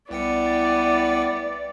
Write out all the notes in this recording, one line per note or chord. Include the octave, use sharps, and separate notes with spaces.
C2 B3 E4 D5 G5 C#7